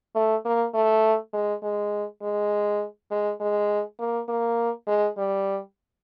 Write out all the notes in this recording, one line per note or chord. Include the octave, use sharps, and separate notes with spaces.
A3
A#3
A3
G#3
G#3
G#3
G#3
G#3
A#3
A#3
G#3
G3